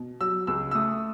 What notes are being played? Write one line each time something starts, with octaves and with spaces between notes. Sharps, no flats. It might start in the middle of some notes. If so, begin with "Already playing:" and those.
Already playing: B2
F#3 E6
C#2 E6
E6
A3 D#6